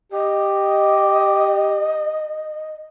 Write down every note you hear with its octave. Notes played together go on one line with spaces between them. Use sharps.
G4 D#5